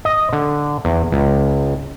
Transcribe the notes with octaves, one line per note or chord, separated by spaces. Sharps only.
D#5
D3
E2
C#2